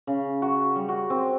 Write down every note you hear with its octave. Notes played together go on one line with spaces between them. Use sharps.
C#3
F#4
G3
F#4
C4